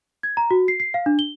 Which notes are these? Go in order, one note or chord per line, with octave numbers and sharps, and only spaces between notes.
G#6
A#5
F#4
C7
C7
F5
D4
G7